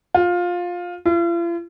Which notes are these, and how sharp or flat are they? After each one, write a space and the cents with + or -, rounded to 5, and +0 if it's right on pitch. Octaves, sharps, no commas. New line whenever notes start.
F4 +15
F4 -45